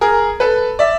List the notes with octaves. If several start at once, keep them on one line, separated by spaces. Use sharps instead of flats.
G#4 A#4
A4 B4
D5 E5